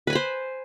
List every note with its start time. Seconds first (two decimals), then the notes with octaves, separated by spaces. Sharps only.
0.07 B4
0.10 G#5
0.13 B5
0.15 C5